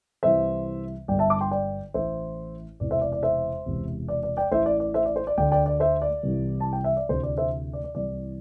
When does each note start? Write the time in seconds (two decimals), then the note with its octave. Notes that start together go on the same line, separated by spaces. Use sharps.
0.23 C2 C3 E3 C5 E5
1.08 G1 G2 D3 D5 G5
1.19 E5 A5
1.30 A5 D6
1.41 G5 C6
1.51 D5 G5
1.94 A1 A2 E3 C5 E5
2.80 E1 E2 C3 E3 D5
2.91 C5 E5
3.02 D5
3.12 D5
3.23 C5 E5
3.66 E1 E2 C3
4.08 D5
4.23 D5
4.37 D5 G5
4.52 A1 A2 E3 C5 E5
4.66 D5
4.80 D5
4.94 C5 E5
5.06 D5
5.16 C5
5.27 D5
5.37 D2 D3 D5 G5
5.52 D5 G5
5.66 D5
5.80 C5 E5
6.02 D5
6.23 C2 C3 E3
6.60 A5
6.73 G5
6.84 E5
6.97 D5
7.09 D2 C3 E3 C5
7.23 D5
7.38 C5 E5
7.73 D5
7.84 D5
7.95 C2 C3 E3 D5